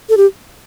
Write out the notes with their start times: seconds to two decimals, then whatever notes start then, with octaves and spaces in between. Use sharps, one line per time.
0.09 A4
0.17 G4